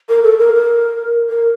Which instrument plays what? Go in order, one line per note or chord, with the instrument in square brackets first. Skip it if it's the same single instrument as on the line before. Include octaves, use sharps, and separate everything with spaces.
[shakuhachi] A#4
A4
A#4
A#4
A#4